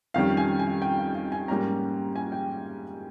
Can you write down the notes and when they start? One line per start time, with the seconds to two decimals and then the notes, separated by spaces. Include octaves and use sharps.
0.14 F2 D#3 G3 C#4 F5
0.37 G#5
0.59 G#5
0.82 G5
0.98 F5
1.15 F5
1.32 G#5
1.48 G#2 G3 A#3 C#4 A#5
2.16 G#5
2.32 G5